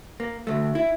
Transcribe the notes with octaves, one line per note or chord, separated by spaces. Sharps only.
A#3
D2 A3
E4